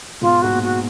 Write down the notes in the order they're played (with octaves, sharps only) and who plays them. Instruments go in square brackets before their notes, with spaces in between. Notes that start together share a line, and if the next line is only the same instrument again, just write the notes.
[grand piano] G#2 B2 [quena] F4
[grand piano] G#2 [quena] F#4
[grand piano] A#2
[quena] F#4